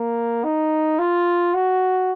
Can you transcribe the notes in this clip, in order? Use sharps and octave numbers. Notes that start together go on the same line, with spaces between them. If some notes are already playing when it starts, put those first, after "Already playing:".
Already playing: A#3
D#4
F4
F#4